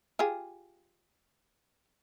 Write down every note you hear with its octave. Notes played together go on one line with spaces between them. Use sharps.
F4 G4 G#4